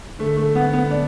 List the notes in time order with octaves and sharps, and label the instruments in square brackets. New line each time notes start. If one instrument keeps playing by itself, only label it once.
[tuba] D3 [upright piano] A3
[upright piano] A3
B3
B3
D4